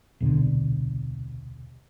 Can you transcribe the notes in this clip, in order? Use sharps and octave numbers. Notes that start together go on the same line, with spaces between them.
D#1 C2 B2 D3